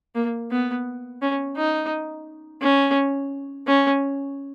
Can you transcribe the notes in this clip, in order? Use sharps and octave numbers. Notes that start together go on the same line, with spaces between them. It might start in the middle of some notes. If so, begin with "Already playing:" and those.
A#3
B3
C#4
D#4
C#4
C#4